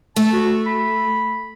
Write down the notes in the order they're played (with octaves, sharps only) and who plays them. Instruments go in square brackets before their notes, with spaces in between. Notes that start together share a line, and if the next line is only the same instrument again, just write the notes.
[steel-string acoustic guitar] A3 [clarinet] A5
[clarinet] F#4
B5